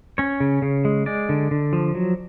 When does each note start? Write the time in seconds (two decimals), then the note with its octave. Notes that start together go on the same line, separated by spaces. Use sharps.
0.18 C#4 C#5
0.40 C#3
0.62 C#3
0.85 G#3
1.06 G#3 D5
1.29 D3
1.51 D3
1.73 F3
1.95 F#3